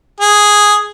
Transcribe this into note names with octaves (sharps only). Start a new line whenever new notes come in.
G#4